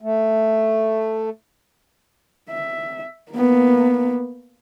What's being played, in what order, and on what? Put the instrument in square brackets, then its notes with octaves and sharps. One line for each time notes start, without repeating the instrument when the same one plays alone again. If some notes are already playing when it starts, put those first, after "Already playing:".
[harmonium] A3
[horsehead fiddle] E5
A#3 B3